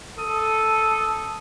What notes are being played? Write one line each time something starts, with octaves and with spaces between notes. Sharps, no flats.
A4 D#6